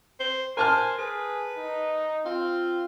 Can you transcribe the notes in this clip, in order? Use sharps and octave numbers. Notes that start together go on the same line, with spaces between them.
C5
A#4 C5 G#5 A5 F6
G#4 B4
D#4
C4 F4